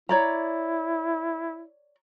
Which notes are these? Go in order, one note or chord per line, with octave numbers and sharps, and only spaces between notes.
E4 C#5 D5 A#5